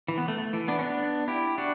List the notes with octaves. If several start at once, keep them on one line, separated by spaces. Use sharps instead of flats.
E3
B3
A3
A3
E3
B3 D4
C#4
B3 D4
E4 G4
D4 F#4